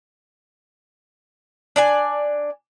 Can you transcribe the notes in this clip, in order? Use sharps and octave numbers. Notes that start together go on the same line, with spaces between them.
D4 D5 G#5